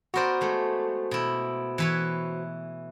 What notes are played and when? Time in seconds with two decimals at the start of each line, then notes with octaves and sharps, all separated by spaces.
0.14 B3 F#4 A#4 C5 D5
0.41 G#3 A3
1.11 B2 E4
1.78 E3 B4 C#5